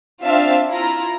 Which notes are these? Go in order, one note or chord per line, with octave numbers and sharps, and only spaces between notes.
C4 D4 F4 E5 F5 A5
E4 F4 A#5